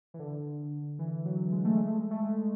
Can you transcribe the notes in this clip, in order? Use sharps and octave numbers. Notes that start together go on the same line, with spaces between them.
E3
D3
E3
F#3
G#3
A3
G#3
A3
G#3
A3
G#3